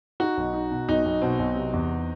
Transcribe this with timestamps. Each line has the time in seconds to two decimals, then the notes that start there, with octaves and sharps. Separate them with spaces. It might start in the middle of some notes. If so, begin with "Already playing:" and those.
0.20 D#4 F#4
0.37 B1
0.53 D#4
0.71 B2
0.89 B1 D#4
1.05 B1
1.22 B2 C4
1.39 B1
1.56 C3
1.73 E2